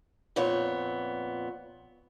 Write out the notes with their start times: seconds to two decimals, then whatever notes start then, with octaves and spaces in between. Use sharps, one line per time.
0.36 F2 A#2 B3 C#5